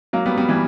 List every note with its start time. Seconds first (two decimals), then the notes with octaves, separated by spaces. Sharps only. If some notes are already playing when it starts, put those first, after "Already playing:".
0.13 F#3 A#3
0.26 G3 B3
0.37 G3 B3
0.49 E3 G3